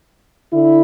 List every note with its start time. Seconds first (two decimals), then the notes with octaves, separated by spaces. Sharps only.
0.51 D3 E4